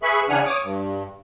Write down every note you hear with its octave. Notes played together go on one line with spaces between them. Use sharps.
G#4 B4 E5 B5 C#6
C#3 E3 D4 F#5 G#5 F6
C#5 D6 D#6
G2